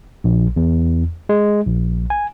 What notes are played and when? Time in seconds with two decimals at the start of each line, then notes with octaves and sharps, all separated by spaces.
0.24 A#1
0.56 E2
1.29 G#3
1.67 A#1
2.10 G#5